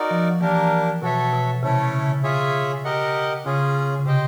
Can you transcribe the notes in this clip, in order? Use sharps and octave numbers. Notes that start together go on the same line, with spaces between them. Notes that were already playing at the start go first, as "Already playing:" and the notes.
Already playing: D#4 F#4 A#4 D5
F3
E3 A#3 D4 G4 A#4
B2 F#4 A4 C#5 E5
B2
C3 A3 C#4 E4 A4 C#5
C#3
F4 G#4 C#5 E5
G4 A#4 D#5 F#5
C#3 C#4 F4 G#4
C#3
C3 G4 C5 D#5 G5